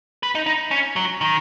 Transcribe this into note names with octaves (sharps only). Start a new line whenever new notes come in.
B4
D#4
D#4
C#4
F#3
D#3